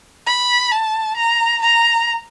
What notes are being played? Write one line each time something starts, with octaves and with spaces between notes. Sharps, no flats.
B5
A5
A#5
A#5